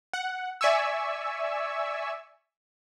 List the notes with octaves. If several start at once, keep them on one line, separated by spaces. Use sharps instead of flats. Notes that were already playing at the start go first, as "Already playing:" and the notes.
F#5
D5 E5 G#5 C#6 E6